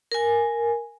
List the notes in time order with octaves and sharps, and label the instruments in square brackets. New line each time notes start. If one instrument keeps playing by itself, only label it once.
[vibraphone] A#4 G#5